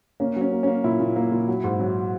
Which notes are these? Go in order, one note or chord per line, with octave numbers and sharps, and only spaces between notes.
A#3 C#4
F#3 C#4
A#3
A#3 C#4
A#2 E4
A#2
A#3
A#2
F#3
G#2
F#3